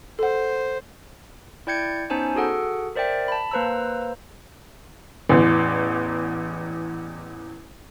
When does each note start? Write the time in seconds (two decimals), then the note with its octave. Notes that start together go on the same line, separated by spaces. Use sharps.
0.19 A4 C5 F#5
1.67 E4 D5 G5 G6 G#6 C#7
2.10 B3 C#4 D#4 C5 G#5 A5
2.35 F#4 G#4 A4 F#5
2.95 A#4 C5 D5 E5 G5
3.28 A5 B5
3.51 A#3 B4 C5 A#5 E6
5.29 A1 E2